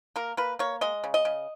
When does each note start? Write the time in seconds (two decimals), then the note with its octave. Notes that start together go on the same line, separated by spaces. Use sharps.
0.16 A#3 A#4
0.37 A#3 B4
0.59 A#3 C#5
0.81 G#3 D#5
1.04 C#3
1.14 D#5
1.25 C#3